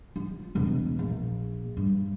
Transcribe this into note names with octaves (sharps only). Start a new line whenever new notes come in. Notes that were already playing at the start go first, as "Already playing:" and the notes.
F4
E1 C#2
A#1
G2